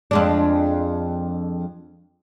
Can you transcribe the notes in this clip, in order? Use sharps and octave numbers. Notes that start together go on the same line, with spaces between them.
F2 G#3 D4